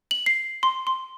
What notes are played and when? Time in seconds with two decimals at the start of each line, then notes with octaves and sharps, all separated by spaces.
0.11 F#7
0.26 C7
0.63 C6
0.87 C6